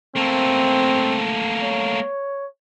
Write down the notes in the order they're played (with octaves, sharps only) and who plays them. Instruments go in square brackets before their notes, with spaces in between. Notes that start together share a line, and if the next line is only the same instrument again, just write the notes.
[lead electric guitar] A3 A#3 [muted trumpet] C4
[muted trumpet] C#5